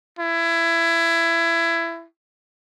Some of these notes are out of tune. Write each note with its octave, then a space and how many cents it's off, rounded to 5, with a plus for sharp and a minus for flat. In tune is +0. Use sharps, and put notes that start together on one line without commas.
E4 +20